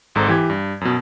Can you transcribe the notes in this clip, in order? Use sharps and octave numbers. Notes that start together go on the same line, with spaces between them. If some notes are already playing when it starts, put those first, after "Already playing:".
G#1 G#2 A4 A#5
E3 G4 G#6
G2
F#2 B2